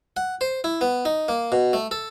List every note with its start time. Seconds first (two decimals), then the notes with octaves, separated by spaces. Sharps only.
0.17 F#5
0.41 C5
0.64 E4
0.81 B3
1.05 D#4
1.28 A#3
1.52 B2
1.73 A3
1.91 A4